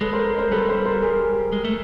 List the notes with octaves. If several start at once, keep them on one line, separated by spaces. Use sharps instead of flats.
G#3 A4 B4
A#4 C5
A#4 C5
G3 A4 B4
A#4 C5
A#4 C5
G#4 A#4
G#3
A3